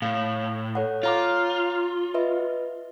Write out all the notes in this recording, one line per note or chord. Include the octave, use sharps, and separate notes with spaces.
A2 F5
A4 C#5 F#5
F4 C#5 A#5 D6
B4 D#5 E5